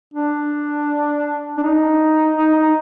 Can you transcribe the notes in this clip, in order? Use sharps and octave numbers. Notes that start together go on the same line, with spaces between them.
D4
D4
D#4
D#4
D#4